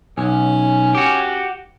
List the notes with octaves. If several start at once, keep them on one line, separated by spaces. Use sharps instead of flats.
B1 C#4
F#4 G4